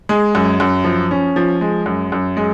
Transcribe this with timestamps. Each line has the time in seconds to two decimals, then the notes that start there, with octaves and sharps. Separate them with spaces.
0.09 G#3
0.35 F#2
0.60 F#2
0.84 F3
1.11 C#4
1.36 F3
1.61 G#3
1.86 F#2
2.12 F#2
2.37 G#3